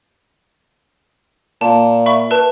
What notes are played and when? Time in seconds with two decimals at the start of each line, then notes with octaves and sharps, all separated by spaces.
1.61 A#2 A5
2.06 E5 B5 C#6
2.31 A#4 B4 A5